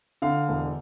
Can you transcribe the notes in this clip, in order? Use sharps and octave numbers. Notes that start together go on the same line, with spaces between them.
D3 F5
E1